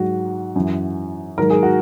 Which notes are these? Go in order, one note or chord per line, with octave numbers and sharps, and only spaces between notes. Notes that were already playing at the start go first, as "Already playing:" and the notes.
Already playing: G#2 F#3 F#4
F#2 E3
G#2 D#3 F#3 A#4
G#4
F#4